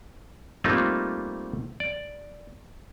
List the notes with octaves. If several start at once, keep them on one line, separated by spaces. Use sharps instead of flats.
G3 A3 A#3 C4 D#4 F4
D5